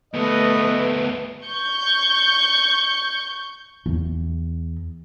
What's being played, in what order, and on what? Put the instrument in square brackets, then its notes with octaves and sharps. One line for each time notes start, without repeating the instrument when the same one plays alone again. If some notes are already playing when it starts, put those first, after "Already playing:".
[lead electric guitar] D2 B3 [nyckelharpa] A3 B4 [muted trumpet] D#5
[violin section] C#6 G6
[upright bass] E2